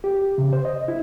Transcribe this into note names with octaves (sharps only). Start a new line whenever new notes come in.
G4
C#3
C5
D#5
E4